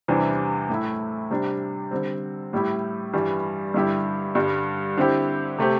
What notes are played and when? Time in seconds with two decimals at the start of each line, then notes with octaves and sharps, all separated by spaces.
0.08 E2 C3 E3 G3 D4
0.69 A2 A3 E4
1.30 C3 G3 D4
1.91 D3 G3 C4
2.53 A2 G3 E4 G4
3.14 G2 E3 G3
3.74 G2 D3 G3 E4 G4
4.35 G2 D3 G3
4.97 D3 C4 E4 G4
5.58 C3 A3 C4 G4